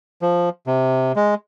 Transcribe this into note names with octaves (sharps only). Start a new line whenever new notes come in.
F3
C3
G#3